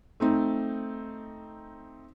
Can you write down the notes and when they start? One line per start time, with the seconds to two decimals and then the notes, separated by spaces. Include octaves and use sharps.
0.20 A3 C4 D#4